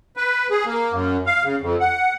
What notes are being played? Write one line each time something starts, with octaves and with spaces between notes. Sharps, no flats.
B4
G#4
A#3
F#2
F5
C#3
F2
F#5